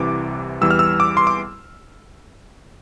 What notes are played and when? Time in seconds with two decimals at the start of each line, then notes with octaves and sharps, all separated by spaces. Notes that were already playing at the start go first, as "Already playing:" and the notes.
Already playing: C2 C3 E3 D6
0.61 E2 E3 G3 E6
0.70 F6
0.79 E6
1.00 D6
1.17 C6
1.27 D6